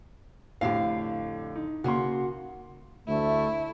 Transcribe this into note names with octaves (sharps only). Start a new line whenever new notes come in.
F2 A2 D3 G4 F5
D#4
C#3 A#3 F#4 C6
D2 A3 E4